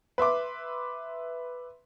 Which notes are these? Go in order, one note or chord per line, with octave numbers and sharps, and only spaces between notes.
B4 E5 C6 D6